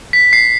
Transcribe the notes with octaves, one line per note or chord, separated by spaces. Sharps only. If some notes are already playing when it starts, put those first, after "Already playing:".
B6
C7